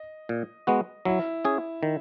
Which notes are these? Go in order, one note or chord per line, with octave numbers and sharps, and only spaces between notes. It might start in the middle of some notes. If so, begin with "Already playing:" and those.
Already playing: D#5
A#2
G#3 B3 F#4
F#3 E4
C#4 G#4
D#3